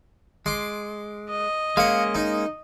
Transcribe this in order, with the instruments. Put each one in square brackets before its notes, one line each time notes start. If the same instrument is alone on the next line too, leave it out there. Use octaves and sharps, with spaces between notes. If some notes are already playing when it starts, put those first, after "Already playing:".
[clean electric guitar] G#3 [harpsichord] C6 D6
[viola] D#5
[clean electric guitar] G#3 A#3 C#4 [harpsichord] F5 F#5
[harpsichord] D#4